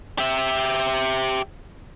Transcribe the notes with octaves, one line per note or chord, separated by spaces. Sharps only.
G4 E5